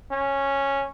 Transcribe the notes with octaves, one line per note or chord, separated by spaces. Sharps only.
C#4